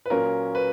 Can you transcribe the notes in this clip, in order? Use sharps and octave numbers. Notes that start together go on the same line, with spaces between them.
B4
A#2 F#3 A#3 C#4 A#4
B4